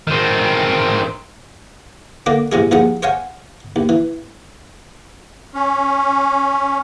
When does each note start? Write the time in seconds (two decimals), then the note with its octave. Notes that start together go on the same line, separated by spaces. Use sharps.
0.07 D#3 C4
2.26 D3 A#3 D4
2.52 A1 C3 G#3 G#4
2.71 D#2 F3 G#4 F#5
3.03 C5 C#5 F5 F#5 G#5
3.76 D#2
3.89 E3
5.54 C#4